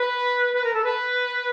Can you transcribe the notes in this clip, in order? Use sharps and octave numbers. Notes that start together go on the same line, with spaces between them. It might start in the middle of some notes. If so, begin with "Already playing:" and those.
Already playing: B4
B4
A#4
A4
B4